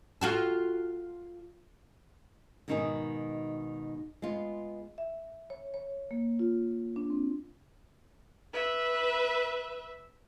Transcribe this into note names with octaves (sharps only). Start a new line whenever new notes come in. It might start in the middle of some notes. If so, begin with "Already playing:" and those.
F4 F#4 A4
G#2 B2 D#3 D#4 F4 G#4
G#3 B3 F4
E5
C#5
C#5
A#3
F4
D4
C4
B4 E5